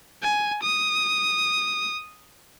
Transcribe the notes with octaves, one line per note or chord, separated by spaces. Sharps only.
G#5
D#6